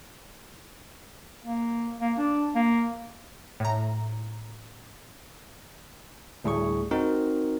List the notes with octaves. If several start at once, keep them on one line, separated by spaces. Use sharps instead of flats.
A#3
A#3
D4
A#3
A2 A#5
D2 A2 G3 G#4 C#6
C4 D#4 F#4 A#4